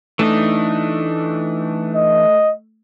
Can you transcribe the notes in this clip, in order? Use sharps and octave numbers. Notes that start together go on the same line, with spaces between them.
E3 A3 D4 D#4
D#5